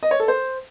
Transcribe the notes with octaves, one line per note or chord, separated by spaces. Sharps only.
D#5
C#5
A4
C5